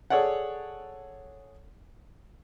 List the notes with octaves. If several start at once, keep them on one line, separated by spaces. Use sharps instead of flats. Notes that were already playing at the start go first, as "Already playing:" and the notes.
G#4 A4 C#5 D5 F#5